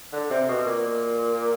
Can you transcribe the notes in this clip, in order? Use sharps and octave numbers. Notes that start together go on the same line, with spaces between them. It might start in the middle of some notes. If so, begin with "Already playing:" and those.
D3
C3
B2
A#2